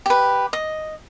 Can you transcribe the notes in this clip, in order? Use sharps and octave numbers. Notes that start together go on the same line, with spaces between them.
G4 B4
D#5